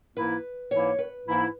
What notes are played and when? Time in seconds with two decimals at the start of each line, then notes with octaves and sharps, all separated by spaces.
0.16 G#2 E3 A#3 E4 B4
0.71 G#2 E3 A#3 E4 C#5
0.99 B4
1.26 G#2 E3 A#3 E4